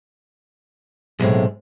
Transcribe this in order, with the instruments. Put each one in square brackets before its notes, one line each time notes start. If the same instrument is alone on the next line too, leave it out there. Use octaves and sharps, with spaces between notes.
[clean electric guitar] B1 [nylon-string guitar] A2 C3 G#3